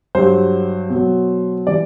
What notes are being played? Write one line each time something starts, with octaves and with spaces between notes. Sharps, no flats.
G2 F#3 C5
B2
F#3
E3 G3 D5